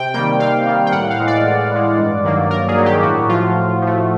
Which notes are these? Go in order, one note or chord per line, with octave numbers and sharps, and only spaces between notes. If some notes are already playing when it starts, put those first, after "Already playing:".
Already playing: C3 G5
D#3 G3 A#3 G5
C3 F5
D#3 G3 A#3
G5
A2 F#5
F5
E3 G#3
D5
A2
E3 G#3
G2
D#3 F#3 A#3
G2 A#4
G#4
D#3 F#3 A#3
G4
A2 F#4
F3 A3 F4
A2
F3
A3